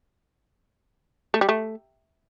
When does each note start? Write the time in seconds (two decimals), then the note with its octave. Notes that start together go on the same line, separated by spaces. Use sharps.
1.34 A3
1.41 G3
1.49 A3